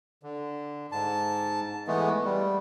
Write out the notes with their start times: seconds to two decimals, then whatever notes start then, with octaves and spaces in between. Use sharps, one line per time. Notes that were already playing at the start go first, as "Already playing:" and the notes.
0.23 D3
0.92 G#2 A5
1.87 E3 G#3 A3 B3
2.24 G3